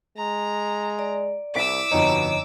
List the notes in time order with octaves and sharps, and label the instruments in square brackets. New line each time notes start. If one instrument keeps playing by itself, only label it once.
[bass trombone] G#3 [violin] A#5
[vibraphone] D5
[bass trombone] C2 [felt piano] E4 D5 B6 [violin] D6 E6
[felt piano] G1 F2 D#4 [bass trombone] B2 [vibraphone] C#5 D#5 A#5